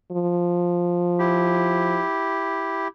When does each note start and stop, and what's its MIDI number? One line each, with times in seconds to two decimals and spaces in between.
0.12 2.02 53
1.19 2.88 64
1.19 2.88 67